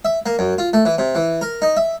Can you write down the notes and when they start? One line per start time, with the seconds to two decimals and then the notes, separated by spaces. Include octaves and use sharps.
0.05 E5
0.26 A#3
0.39 F#2
0.58 F4
0.73 A3
0.85 E3
0.98 C3
1.15 E3
1.41 A#4
1.62 D#4
1.77 E5